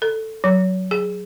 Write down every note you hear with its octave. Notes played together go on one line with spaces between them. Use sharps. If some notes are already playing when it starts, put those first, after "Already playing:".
A4
F#3
G#4